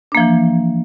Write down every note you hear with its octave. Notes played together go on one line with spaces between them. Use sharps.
E3 F3 A#3 D4